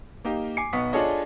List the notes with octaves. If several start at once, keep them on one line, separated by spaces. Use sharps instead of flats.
A#3 D#4 G4
G#5 D6 C7 C#7
B1 B3 C#6 D#6 B6
D4 F4 G#4 A4 C#5 D#5